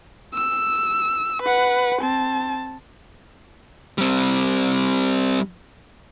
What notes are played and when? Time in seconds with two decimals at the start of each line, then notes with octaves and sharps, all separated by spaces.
0.34 E6
1.42 B4 F#5
2.02 C4 A5
3.98 G3 C4